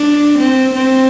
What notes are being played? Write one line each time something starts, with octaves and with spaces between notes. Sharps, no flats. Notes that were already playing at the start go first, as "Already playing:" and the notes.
Already playing: D4
C4
C4